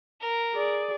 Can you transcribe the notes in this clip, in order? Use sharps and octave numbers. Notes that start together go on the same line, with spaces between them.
A#4
G#4 D5